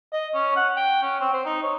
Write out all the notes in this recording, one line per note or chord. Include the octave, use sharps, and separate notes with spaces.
D#5
C#4
F#5
G5
C#4
C4
C5
D#4
C#5